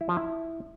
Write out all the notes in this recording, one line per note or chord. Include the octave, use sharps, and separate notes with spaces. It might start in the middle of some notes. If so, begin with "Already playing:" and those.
E4
F3
E4